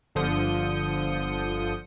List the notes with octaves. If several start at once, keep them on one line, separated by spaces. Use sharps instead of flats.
G1 D3 F3 D#6 G6 C#7